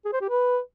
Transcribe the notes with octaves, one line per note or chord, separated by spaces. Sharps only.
G#4
C5
G4
B4